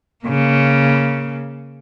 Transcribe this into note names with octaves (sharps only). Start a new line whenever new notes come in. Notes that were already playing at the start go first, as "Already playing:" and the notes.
C#3 A#3